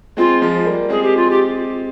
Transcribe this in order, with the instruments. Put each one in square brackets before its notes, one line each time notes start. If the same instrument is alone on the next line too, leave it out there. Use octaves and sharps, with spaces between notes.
[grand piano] G#3 C4 [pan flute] F4
[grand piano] F3 G#3
G3 A#3
[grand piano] G#3 C4 [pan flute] G#4
[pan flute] G4
F4
G4